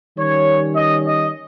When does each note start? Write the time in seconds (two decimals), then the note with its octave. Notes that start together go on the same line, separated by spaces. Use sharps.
0.17 D#3 G3 C#4 C#5
0.75 D#5
1.05 D#5